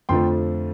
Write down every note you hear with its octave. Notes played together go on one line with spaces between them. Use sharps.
F2 D3 F3 A3 G5 C6